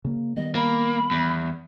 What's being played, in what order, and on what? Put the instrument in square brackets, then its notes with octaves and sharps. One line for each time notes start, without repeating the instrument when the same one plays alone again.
[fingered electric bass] C#3 A#3
[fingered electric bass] D#3 G3 B3 [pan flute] D#5
[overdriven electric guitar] A#3 [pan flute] B5
[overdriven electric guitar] E2